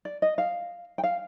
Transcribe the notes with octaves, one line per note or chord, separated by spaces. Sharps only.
D5
D#5
F5
G5
F5